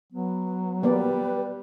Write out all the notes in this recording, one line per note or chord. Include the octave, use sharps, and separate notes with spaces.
F#3 B3
G3 A#3 B3 B4 D5